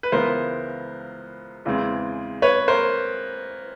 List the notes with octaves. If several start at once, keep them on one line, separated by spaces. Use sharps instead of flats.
B4
C#2 C#3 E3 G#3 B3 A#4 C5
E2 C#3 E3 G#3 C4
B4 C#5
A#4 C5